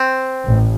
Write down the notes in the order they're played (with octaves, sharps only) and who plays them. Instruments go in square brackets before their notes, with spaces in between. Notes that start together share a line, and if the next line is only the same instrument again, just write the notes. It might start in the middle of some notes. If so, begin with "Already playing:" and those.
Already playing: [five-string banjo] C4
[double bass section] A1